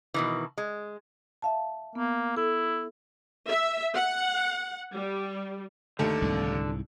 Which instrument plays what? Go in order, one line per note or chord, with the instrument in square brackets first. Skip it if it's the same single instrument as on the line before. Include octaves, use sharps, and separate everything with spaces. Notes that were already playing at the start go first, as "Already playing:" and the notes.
[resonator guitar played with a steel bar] B2 D#3 E3
G#3
[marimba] E5 F5 A5
[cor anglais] A#3 [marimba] B3
[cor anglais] E4 [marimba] A4
[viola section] E5
F#5
G3
[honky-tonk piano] D#2 D#3 A3 [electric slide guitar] D3
[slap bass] C2 G#2